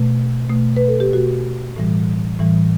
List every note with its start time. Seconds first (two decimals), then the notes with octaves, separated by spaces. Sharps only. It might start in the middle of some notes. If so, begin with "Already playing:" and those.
Already playing: B2 A3
0.50 B2 A3
0.77 B4
0.88 A4
1.00 G4
1.13 B2 A3 F#4
1.76 A2 E3 G3
2.39 A2 E3 G3